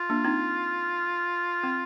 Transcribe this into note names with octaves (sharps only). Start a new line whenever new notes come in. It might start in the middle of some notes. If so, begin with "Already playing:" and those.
Already playing: F4
A#3 D4
C4 D#4
C4